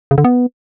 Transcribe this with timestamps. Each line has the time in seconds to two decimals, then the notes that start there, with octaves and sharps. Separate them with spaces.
0.11 C#3
0.18 D3
0.25 B3